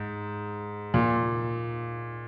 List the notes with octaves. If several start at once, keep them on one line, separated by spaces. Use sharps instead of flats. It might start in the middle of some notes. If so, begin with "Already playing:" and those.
Already playing: G#2
A#2